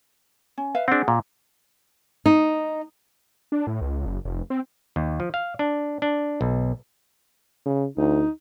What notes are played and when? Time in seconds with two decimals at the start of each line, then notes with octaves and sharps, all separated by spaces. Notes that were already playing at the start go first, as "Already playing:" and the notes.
0.58 C#4
0.75 B4 E5 F5
0.88 C4 D4 G#4 F#5
1.08 A#2
2.26 D#4
3.52 D4
3.67 A2
3.81 C#2
4.06 F#1
4.25 F1
4.50 C4
4.96 D#2
5.20 F3
5.34 F5
5.59 D4
6.02 D4
6.41 B1
7.66 C#3
7.97 D2 D#4